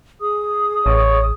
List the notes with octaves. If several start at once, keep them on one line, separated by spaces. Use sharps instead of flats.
G#4 D#6
A1 C#5